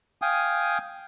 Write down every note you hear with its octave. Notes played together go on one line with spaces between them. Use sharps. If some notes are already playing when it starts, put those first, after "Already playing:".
F5 G5 G#5 D#6